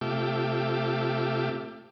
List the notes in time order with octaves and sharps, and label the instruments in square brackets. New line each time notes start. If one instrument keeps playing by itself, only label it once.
[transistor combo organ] C3 A3 F4 G4 E5 D6